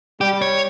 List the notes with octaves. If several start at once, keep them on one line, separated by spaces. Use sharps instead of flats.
G3 G4
C#5